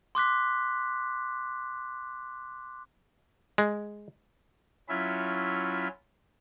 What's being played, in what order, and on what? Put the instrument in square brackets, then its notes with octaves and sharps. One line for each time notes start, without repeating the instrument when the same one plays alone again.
[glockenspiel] C6 D6 F#6 B6
[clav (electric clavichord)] G#3
[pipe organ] F#3 C#4 E4 F4 E5